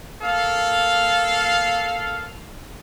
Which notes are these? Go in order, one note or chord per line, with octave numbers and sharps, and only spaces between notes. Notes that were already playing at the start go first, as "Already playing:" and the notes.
A#3 A4 F5